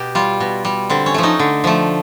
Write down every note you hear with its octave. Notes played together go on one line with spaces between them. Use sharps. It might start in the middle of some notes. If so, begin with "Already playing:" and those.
Already playing: B2 G4
G3 F4
B2
G3
D3 C4
C#4
F3 A3
D#4
D3
F3 A3